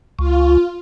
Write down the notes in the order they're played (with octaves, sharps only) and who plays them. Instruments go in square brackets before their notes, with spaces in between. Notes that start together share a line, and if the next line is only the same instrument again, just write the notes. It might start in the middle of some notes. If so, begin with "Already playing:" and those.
[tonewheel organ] C#2 [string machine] F4